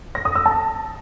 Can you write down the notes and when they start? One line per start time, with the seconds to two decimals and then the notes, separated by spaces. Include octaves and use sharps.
0.15 A#6
0.25 D#6
0.35 E6
0.46 A5